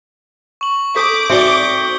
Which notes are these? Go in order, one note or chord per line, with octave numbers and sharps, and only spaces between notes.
C#6 F#7
A4 D6 D#6 G6 B6
C4 D#4 F#4 D5 E5 G6 C#7 G7